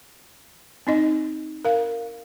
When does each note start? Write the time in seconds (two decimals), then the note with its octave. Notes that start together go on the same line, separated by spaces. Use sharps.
0.87 C4 D#4 D#5
1.65 A#4 F5